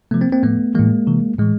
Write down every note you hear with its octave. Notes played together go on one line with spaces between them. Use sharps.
C3 F3 A3 B3
A#3 C4
A#3 C4
A2 F3 A3 B3
A2 E3 G#3 A#3
C3 E3
A2 E3 G#3